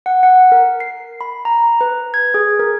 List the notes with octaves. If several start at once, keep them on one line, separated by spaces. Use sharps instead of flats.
F#5
F#5
A#4
C7
B5
A#5
B4
G#6
G#4
A#4